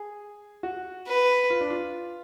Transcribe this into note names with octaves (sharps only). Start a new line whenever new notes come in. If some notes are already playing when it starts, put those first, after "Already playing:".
Already playing: G#4
F#4
B4
F4
D4
F4